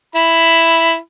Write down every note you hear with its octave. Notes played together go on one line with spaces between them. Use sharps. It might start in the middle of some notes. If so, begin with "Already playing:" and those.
E4 B5